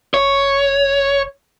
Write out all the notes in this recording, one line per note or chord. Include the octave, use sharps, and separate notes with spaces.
F1 C#5